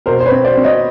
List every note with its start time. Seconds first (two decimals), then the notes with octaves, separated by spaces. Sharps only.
0.06 B2 A#4 C5
0.20 C5
0.26 B4 C#5
0.31 C4
0.45 C5 D5
0.57 C4
0.64 C#5 D#5